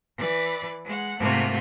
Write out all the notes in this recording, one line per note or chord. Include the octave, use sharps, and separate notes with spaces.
E3 B4 D5
G#3 F#5
G#2 C3 A3 A#3 F4 F#4